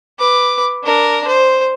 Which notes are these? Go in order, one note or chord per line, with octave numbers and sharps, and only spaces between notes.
B4 D6
D4 A#4
C5